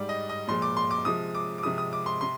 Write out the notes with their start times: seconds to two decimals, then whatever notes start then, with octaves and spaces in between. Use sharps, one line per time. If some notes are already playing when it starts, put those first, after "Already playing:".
Already playing: G#2 G3 D5
0.09 D#5
0.29 D#5
0.48 A#2 F3 G#3 C6
0.62 D6
0.77 C6
0.91 D6
1.05 C3 F3 G#3 D#6
1.35 D6
1.58 D6
1.63 C3 F3 G#3 D#6
1.78 D#6
1.93 D6
2.06 C6
2.21 C3 C6